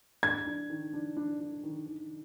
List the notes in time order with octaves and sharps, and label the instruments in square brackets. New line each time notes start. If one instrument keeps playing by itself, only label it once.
[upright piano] D4 [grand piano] G#6
[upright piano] D4
D#3
D4
D4
D4
D#3
D#3